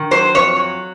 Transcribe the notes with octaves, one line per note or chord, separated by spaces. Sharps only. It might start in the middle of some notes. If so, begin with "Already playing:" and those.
Already playing: D#3
F#3 C5
F2 C#5
F#3